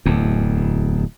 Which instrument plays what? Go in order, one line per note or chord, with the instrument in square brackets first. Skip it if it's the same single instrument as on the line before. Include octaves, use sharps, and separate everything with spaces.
[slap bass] D1 E2